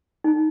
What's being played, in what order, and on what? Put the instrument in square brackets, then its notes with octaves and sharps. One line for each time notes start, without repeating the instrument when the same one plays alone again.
[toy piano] D#4